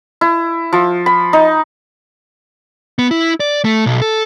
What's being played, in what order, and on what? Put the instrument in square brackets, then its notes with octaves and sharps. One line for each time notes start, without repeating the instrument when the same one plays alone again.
[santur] E4
F3
B5
D#4
[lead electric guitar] B3
E4
D5
A3
B1
A4